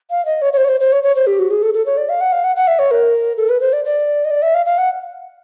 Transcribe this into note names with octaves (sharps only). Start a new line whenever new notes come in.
F5
D#5
C#5
C#5
C5
C#5
C5
C5
C#5
C#5
C5
G4
F#4
G#4
A4
A4
C#5
D5
F5
F#5
F5
F#5
F#5
E5
C#5
A#4
A4
B4
C5
D5
D5
D#5
D5
E5
F5
F5
F#5